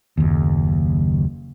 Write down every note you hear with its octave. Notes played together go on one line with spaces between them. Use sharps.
F#1 D#2